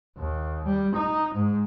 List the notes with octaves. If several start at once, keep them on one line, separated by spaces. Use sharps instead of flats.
D#2
G3
D#4
G#2